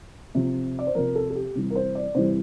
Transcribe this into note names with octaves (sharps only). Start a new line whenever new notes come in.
C3 F3
D5
C5
C3 F3 A#4
A4
A4
G4
C3 E3 G3
A#4
C5
D5
C3 E3 G3 C5